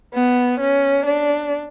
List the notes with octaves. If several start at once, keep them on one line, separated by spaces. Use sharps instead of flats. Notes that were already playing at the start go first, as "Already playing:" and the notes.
B3
C#4
D4